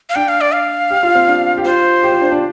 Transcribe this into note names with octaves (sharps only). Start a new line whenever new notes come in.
F5
D4 G5
F5
D5
F5
G4
F4
C4
D4
G4
F4 C5
G4
F4
D4
D4